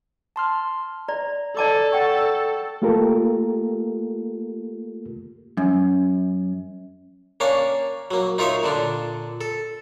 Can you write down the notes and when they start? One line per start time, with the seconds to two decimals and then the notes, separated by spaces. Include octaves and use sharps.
0.36 A5 C6 F6
1.09 D5 A#5
1.57 A4 D5 A5 D6
1.92 D5 F#5 G5 C#6
2.82 A3 A#3 F4 G4 A4 A#4
5.57 F#2
7.40 A#3 C#4 D4 C#5 F5
8.11 F#3 A#3
8.38 D#4 F4 A#4 C#5 E5 F5
8.63 A#2 D3 D4
9.41 A4